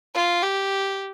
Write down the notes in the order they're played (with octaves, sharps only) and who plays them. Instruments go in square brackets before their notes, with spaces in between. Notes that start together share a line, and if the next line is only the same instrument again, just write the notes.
[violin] F4
G4